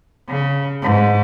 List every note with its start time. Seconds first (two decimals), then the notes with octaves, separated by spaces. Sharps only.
0.29 C#3
0.82 G#2